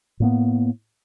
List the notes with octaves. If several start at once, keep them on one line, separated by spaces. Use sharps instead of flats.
A2 A#3 B3